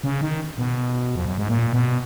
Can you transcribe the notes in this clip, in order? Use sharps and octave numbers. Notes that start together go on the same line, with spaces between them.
C#3
D#3
B2
F2
F#2
G#2
A#2
B2